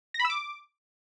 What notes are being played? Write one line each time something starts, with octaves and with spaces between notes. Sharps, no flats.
A#6
B5
E6
D6